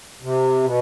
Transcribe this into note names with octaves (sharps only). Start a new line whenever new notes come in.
C3
B2